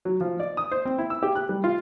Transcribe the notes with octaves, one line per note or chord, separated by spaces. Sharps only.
F#3
F3
D5
D#6
C5
C4
E4
E6
G4
F#6
G3
F4